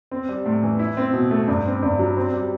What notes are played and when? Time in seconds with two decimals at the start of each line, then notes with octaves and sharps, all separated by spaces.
0.11 C4
0.29 G3
0.46 A2
0.63 E3
0.79 E4
0.97 C4
1.13 B2
1.31 A3
1.48 G2
1.66 C4
1.83 G2
1.99 F#3
2.17 C4
2.33 G3